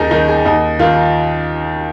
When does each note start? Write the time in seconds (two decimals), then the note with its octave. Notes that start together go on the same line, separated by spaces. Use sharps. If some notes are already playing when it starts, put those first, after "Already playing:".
Already playing: D#2 D#3 D#4 G#4 A#4
0.11 D#3 D#4
0.28 G#4
0.45 D#2 D#5
0.79 D#3 F4